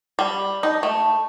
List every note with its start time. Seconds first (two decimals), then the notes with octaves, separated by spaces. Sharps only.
0.19 G3
0.63 D#4
0.83 A3